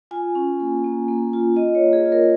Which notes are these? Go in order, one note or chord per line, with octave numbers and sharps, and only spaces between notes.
F4 G#5
C#4
A#3
A#3
A#3
F4
F4 D#5
C#5
A#3
G#4
F4
A#4